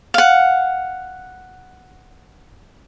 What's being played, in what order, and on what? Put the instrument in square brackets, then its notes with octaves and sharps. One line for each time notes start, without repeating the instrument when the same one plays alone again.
[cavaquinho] F5 F#5